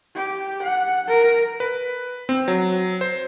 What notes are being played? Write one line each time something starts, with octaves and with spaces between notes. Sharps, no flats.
G4
F#5
A#4
B4
C4
F#3
C5